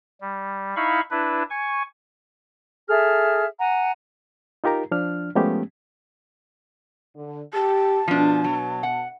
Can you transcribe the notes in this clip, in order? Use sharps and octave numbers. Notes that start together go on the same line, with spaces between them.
G3
D#4 E4 F5 B5 C#6
D4 E4 B4
G#5 C#6
G#4 A4 E5 F6
F#5 G#5 A#5
D#4 F4 G4 A#4 A#5
F3 D4 F6
F3 G#3 A3 B3 C#4 G4
D3
G4 A5
B2 F3 D4
F#3
F#5